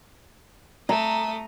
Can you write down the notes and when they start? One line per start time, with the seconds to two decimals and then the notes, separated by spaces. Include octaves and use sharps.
0.89 A3 A#5 D#6